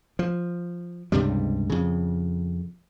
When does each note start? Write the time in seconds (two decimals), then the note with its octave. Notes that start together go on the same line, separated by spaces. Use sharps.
0.19 F3
1.12 C#2 G2 C3 G3
1.70 F2 C#3